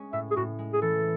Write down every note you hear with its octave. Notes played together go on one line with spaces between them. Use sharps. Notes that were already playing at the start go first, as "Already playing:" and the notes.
Already playing: G#3 C#4
A2 E5
G#4
A2 F#4
G#3
G#4
E3 A4